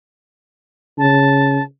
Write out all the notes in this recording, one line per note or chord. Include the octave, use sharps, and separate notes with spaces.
C#3 A5